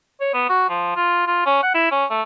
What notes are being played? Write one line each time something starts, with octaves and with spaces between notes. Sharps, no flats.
C#5
B3
F#4
F3
F4
F4
C#4
F#5
E4
C#4
A3